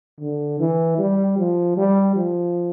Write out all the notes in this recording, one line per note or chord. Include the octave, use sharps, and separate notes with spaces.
D3
E3
G3
F3
G3
F3